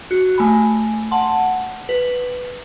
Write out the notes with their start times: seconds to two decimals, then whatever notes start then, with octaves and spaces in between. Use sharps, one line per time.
0.11 F#4
0.38 A3 G#5 B5
1.11 F#5 A5 C6
1.89 B4